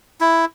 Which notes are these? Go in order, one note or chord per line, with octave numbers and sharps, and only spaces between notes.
E4